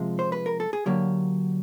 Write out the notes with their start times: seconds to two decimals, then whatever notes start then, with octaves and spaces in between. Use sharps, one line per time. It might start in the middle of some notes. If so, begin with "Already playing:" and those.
Already playing: C3 F3 G#3
0.19 C5
0.32 B4
0.46 A#4
0.60 A4
0.73 G#4
0.86 D3 F#3 A#3 G4